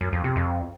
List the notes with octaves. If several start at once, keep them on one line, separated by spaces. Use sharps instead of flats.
F#2
F2
C3
F2